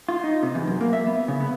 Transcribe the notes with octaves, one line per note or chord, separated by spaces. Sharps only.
F4
D#4
C3
E2
F#2
A#3
E5
B3
C#3
B3